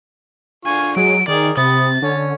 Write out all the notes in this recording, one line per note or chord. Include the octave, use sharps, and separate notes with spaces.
D3 F4 G#5 C#6
F#3 G#3 D7
D#3 G#4 A#4 D5
C3 B5 D#6 A6
D3 C#4